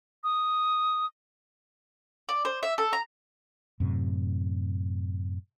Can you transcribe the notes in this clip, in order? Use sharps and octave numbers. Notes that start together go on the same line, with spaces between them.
D#6
D5
C5
E5
A4
A#5
F#2 A2 C3